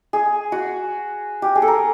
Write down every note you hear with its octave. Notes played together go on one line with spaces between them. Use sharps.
G#4
F#4
G4
G#4
A4
A#4